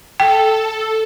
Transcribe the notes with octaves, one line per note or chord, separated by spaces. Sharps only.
A4 G5